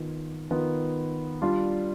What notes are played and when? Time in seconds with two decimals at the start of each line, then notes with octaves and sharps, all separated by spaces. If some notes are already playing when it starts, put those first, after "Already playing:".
Already playing: D#3 B3 F4
0.51 D#3 B3 F4
1.42 G3 D4 F4